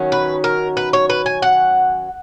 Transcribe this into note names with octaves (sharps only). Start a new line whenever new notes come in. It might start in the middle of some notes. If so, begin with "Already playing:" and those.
Already playing: D#3 F#3 C#4
B4
A#4
B4
C#5
B4
G#5
F#5